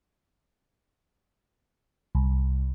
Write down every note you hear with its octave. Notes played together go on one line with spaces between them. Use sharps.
C2